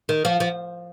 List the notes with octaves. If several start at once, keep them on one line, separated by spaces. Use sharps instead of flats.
D#3
F3
F3